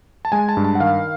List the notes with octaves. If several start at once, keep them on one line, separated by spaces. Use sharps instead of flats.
A5
G#3 G#5
A5
G2
A5
F#5
D#3 F5